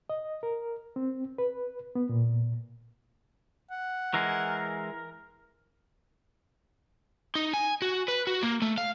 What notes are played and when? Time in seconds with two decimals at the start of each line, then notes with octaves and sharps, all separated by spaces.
0.10 D#5
0.43 A#4
0.96 C4
1.38 B4
1.95 B3
2.09 A#2
3.71 F#5
4.14 E3 G#3 A#4
7.35 D#4
7.54 G#5
7.82 F#4
8.08 B4
8.27 F#4
8.43 A#3
8.62 A3
8.78 F5